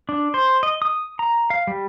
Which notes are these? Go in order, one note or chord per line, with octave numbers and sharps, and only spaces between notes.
D4
C5
D#5
D#6
A#5
F5
G3